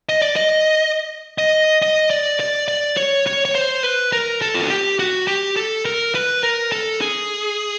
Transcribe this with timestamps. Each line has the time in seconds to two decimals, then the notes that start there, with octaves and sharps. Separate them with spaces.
0.09 D#5
0.22 D5
0.36 D#5
1.38 D#5
1.82 D#5
2.10 D5
2.40 D5
2.68 D5
2.97 C#5
3.27 C#5
3.45 C#5
3.55 C5
3.83 B4
4.12 A#4
4.42 A4
4.54 F4
4.63 F#4
4.70 G4
4.99 F#4
5.27 G4
5.56 A4
5.85 A#4
6.15 B4
6.43 A#4
6.72 A4
7.01 G#4